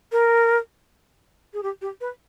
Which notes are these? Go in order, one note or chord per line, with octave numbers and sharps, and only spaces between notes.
A#4
G#4
G4
G4
B4